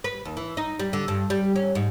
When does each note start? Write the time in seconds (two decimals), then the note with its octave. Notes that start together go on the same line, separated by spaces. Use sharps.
0.04 B4
0.25 D#2
0.37 E3
0.57 D#4
0.79 G3
0.93 D3
1.08 G2
1.30 G3
1.56 C#4
1.75 G#2